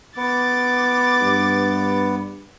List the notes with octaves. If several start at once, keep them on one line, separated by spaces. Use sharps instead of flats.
B3 D6 A6
G2